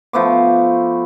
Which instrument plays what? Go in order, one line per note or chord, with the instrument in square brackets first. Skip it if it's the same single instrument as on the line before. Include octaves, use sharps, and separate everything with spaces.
[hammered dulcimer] F3 A3 B3 D6